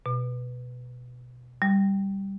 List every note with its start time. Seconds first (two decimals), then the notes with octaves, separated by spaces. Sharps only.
0.06 B2
1.62 G3